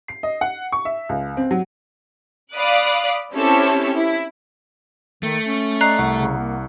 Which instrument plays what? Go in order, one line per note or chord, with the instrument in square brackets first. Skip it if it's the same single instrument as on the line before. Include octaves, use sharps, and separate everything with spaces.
[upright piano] C7
D#5
F#5
C#6
E5
C#2
C4
F#3
[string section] D5 F5 B5 D6 D#6 F#6
C4 C#4 E4 G4 A4 C#5
E4
[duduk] D#3 [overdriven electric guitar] A3
[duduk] C#4
[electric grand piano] D5 D#5 [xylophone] A#5 F#6 C7
[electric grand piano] C2 F#5 C#6
[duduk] C#3
A#3